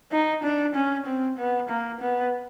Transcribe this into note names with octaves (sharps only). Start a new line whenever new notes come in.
D#4
D4
C#4
C4
B3
A#3
B3